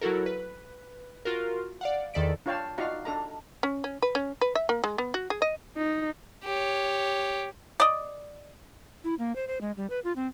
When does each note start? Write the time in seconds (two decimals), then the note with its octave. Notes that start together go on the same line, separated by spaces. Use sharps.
0.01 F#3 E4 F#4 A4 A#4
0.26 B4
1.25 F4 F#4 A#4
1.81 D5 F5 F#5
2.14 E2 D#3 A4 D5 B6 D7
2.46 D4 F4 C#5 F5 G5 A5
2.78 D#4 F4 F#4 D5 F5 A#5
3.05 D4 A4 A#5
3.63 C#4
3.84 C#4
4.02 B4
4.15 C#4
4.41 B4
4.55 E5
4.69 A#3
4.84 G#3
4.98 B3
5.14 F#4
5.30 G#4
5.42 D#5
5.77 D#4
6.44 G4 C#5
7.80 D5 D#5
9.04 E4
9.19 A#3
9.36 C5
9.48 C5
9.61 G#3
9.77 G3
9.90 B4
10.04 F4
10.16 C4